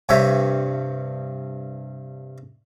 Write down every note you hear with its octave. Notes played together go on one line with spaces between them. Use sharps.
G2 C3 G4 C#5 E5